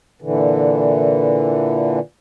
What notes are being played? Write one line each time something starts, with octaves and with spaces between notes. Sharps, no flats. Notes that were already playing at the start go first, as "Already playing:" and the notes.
A#2 D3 E3